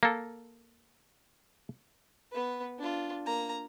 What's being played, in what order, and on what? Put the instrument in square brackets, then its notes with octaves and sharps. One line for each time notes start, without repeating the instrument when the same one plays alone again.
[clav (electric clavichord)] A#3 A4
[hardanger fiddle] B3 B4
D4 F4
A#3 A#5